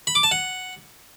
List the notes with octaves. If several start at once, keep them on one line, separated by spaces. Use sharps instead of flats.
B5
D6
A5
F#5